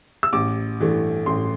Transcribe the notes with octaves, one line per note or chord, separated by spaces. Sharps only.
E6
A1 D6
G2 E3 A3
A1 C6